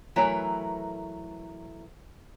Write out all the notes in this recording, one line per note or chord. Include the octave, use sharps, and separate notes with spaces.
E3 F#3 A3 A#4 B4 A#5